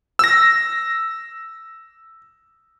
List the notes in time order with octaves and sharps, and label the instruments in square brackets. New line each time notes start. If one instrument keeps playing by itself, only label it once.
[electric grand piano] E6 A#6